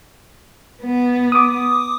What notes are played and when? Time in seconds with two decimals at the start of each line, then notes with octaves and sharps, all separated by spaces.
0.83 B3
1.32 D6 D#6